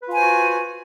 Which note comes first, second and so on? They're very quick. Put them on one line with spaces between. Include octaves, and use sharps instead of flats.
B4 F4 G#5 C5 F#4